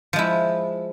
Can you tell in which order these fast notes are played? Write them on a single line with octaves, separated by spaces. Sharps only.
F3 G#3 E4